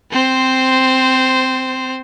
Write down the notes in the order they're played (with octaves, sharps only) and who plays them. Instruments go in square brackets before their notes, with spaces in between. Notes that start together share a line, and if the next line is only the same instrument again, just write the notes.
[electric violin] C4 C5